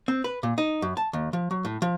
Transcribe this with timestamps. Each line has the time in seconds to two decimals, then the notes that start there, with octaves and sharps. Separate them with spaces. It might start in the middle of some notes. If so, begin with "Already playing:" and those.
0.08 C4
0.24 B4
0.43 A#2
0.58 D#4
0.82 F#2
0.97 A5
1.13 D#2
1.33 F3
1.51 F#3
1.65 A2
1.82 F3